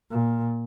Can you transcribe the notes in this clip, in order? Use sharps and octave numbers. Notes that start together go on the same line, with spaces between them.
A#2